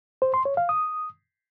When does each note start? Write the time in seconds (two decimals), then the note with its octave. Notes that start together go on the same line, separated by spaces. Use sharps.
0.22 C5
0.34 C6
0.45 C#5
0.57 F5
0.69 D#6